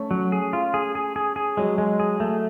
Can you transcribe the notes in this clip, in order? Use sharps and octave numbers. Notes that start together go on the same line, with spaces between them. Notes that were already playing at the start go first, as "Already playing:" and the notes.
Already playing: A3 C#4
F#3
G#4
F4
G#4
G#4
G#4
G#4
F#3 G#3
G#3
G#4
A3